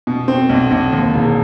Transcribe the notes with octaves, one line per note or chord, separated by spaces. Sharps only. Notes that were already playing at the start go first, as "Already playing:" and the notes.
B2
C4
B1
B1
D#2
E1